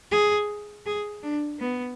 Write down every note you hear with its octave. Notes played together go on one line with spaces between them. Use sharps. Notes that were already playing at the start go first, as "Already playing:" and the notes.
G#4
G#4
D4
B3